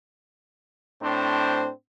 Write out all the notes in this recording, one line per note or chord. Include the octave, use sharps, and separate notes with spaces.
A2 C4 D4 C5